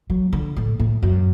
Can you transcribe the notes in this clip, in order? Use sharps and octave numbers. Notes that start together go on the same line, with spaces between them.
F#3
D3
A2
A2
F#2